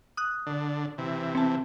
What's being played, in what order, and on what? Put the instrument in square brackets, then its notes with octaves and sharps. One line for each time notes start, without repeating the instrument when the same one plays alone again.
[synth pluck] D#6 F#6
[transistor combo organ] D3
C3 E3
[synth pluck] C4 A5